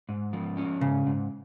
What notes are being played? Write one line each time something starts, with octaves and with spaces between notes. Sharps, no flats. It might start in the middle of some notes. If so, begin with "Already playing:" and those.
G#2
F3
C#4
G#2 C#3
G#2